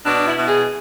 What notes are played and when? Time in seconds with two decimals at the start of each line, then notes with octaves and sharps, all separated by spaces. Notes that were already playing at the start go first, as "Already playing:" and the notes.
0.05 B2 D4
0.26 E4
0.37 B2
0.47 G#4